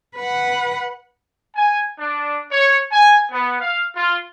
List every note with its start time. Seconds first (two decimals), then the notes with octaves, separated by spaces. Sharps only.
0.17 B4 F#5
1.55 G#5
1.98 D4
2.51 C#5
2.91 G#5
3.31 B3
3.60 F5
3.94 F4